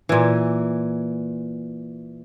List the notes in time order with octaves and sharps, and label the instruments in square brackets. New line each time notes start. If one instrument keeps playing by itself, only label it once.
[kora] A#2 E3